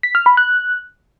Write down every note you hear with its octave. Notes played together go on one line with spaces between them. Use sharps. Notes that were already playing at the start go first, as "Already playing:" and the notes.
B6
F6
B5
F#6